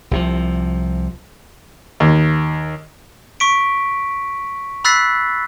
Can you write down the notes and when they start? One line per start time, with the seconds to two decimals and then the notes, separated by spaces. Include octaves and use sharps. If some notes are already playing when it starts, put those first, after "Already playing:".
0.11 C2 C3 F3
2.00 D#2
3.40 C#6 B6 D7
4.84 B5 E6 F#6 A6 B6 C7